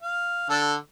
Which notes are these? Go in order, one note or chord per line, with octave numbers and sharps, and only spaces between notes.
F5
D3 A4